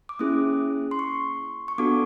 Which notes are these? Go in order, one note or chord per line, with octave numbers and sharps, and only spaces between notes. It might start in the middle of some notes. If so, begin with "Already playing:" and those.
D6
A#3 C#4 E4 G#4 D#6
C6
C#6
C#6
B3 D4 F#4 A4 D6